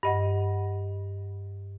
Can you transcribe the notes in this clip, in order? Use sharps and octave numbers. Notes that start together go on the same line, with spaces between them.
G2 D#5 F#5